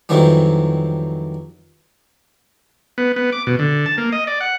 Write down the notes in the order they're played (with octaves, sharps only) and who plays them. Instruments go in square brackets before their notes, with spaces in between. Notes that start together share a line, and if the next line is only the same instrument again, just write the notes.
[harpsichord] F2 D#3 E3 F#3 G3
[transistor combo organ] B3
B3
D6
B2
D3
A5
A#3
D#5
D5
F#5